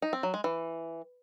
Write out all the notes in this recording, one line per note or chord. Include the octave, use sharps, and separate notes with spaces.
D#4
C4
F#3
G#3
E3